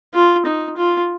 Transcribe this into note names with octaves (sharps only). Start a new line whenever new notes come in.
F4
D#4
F4